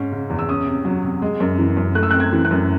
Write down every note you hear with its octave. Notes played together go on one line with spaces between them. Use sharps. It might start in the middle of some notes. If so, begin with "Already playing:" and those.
Already playing: G#2 G#3 C#4
C#3
E2
E6
C#4 D#6
C3
F#3
C3
G#3
F#2
E3
F#2
A3 F#6
E6
F#6
C4
G#6
E3
F#6
F#2